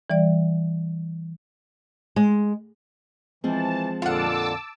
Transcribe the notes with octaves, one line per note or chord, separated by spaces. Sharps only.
E3 G3 D5
G#3
E3 F3 G#3 C4 A5
F2 A#2 D3 F4 F#5 A5 D6 E6